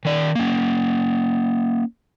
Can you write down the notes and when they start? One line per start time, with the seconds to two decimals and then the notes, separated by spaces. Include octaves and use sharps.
0.05 D#3 D5
0.35 A#3 C#4